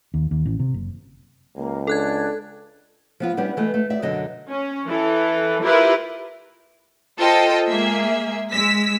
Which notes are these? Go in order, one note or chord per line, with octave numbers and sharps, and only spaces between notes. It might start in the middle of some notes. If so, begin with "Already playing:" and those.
D#2
D#2
A1
C3
F#1
C#2 A#3
D4 A4 F#6 G#6
F3 B3 F4
G3 B3 C#4 D4 E4
E3 G#3 A3 B3
A3
D5 E5
F#2 B2 D3 F#3 B3 D#5
C#4
E3 A4
E4 F4 G4 A#4 B4
F4 A4 C5 D#5 G5
G#3 A#3 G#4 E5
G#3 E6 B6